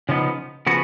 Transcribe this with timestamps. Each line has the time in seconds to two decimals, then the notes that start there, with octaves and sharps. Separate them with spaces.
0.09 C#3 F3 B3 D#4
0.67 C#3 F3 B3 F#4